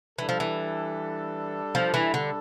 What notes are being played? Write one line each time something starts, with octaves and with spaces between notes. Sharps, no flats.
E3 G3 D4 A4
F3
E3
F3
E3
D3